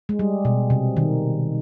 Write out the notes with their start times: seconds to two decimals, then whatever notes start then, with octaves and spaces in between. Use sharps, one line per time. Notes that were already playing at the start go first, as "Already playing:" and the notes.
0.09 G#3
0.19 G3
0.45 B2
0.70 C3
0.97 D#3